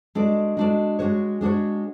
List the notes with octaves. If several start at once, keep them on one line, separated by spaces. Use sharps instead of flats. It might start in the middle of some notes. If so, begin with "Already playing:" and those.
G#3 D4 F#4 A4 D5
G#3 D4 F#4 A4 D5
G#3 D4 F#4 C#5
G#3 D4 F#4 C#5